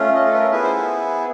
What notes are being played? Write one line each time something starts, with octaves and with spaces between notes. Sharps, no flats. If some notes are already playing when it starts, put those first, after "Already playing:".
Already playing: A3 C#4 F4
D#5
A4
B4
A#4
B3 E4 G#4 B4
C5